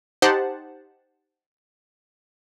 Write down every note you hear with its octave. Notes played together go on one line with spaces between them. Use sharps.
D#4 G4 C5 F#5 A5